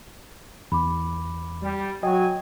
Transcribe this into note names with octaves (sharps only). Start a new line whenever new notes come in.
E2 B5 D6
G3
F#3 D#5 G5 G#5